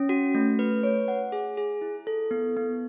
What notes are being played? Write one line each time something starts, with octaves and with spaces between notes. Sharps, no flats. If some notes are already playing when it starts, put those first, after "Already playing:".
Already playing: C#4
F#4
A3
B4
C#5
F#5
G#4
G#4
E4
A4
B3
B3